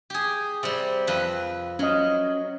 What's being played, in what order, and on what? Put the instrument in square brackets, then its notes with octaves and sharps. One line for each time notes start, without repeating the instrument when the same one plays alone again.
[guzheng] G4 G#4
C3 G3
F2 B4
[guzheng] F#3 [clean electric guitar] C#4 D#5